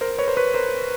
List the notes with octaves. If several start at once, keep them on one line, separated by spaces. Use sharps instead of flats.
A#4 C5
B4 C#5
A#4 C5
B4 C#5
A#4 C5